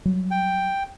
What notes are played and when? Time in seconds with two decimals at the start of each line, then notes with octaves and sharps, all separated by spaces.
0.05 F#3 G3
0.31 G5